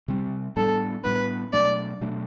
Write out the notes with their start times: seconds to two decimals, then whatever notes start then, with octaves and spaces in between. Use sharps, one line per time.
0.08 C3 G3 C4
0.56 A2 G3 B3 D4 A4
1.04 A2 G3 B3 D4 B4
1.53 B2 F#3 A3 D4 D5
2.01 B2 F#3 A3 D4